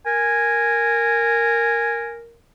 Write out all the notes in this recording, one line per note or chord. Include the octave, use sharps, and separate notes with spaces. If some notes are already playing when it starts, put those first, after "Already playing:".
A#4 G#5